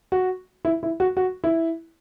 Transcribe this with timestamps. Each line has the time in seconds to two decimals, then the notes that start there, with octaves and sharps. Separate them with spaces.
0.12 F#4
0.65 E4
0.83 E4
1.00 F#4
1.17 F#4
1.44 E4